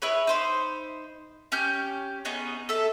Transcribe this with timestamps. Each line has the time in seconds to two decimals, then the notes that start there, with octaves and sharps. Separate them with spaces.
0.02 E4 G#4 B4 C#5
0.27 D#4 C5 B5
1.52 C#4 G4 F6 G6
2.25 B3 C#4 D#4 G#4
2.69 A4 E5